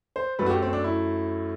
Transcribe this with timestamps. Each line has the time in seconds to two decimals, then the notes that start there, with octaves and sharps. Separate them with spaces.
0.16 C5
0.39 F#2 F#3 A3 B4
0.46 F#4
0.50 G4
0.62 C4
0.73 D4
0.84 E4